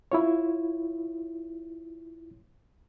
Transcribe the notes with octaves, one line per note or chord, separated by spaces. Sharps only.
E4 F4 C#5